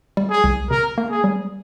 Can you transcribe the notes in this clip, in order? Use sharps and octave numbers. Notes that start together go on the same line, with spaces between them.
G3
G#4
C2
C3 A#4
A#3
G#4
G3